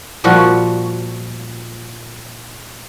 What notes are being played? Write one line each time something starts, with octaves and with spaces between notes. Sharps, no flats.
A#2 F3 G3 F#4